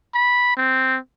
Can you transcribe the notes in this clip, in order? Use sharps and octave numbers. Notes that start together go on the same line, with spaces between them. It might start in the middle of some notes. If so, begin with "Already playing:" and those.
B5
C4